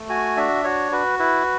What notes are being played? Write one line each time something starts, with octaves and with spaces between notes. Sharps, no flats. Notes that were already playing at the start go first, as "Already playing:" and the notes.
Already playing: A3
F#4 G#5
D4 E5
F#4 C#5
F#4 B4
E4 B4